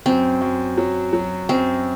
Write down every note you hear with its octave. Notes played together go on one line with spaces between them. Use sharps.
F#2 C4
F#2
F#3
F#3
F#2 C4